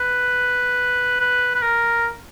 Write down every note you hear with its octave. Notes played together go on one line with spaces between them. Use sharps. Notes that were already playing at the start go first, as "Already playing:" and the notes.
Already playing: B4
B4
B4
A#4